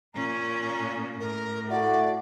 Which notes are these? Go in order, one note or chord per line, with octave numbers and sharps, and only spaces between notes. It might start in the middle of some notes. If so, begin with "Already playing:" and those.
A#2 C#4 A#5
A2 A#4
A3 E4 F#4 D5